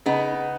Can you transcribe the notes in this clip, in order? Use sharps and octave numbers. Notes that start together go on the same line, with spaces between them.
C#3 B3 D#4